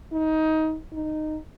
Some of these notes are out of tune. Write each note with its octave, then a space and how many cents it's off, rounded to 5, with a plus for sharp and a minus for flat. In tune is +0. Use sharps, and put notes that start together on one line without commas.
D#4 +20
D#4 -10